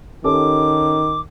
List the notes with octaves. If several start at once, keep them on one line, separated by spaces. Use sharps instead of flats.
D#3 C#4 G4 A4 D6